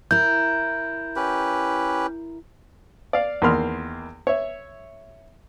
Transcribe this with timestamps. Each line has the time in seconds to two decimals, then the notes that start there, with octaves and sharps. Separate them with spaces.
0.11 E4 A#4 G6
1.16 C#4 G4 B4
3.13 D5 F5
3.42 E2 D#3 A#3 B5 C6 F6
4.27 C#5 E5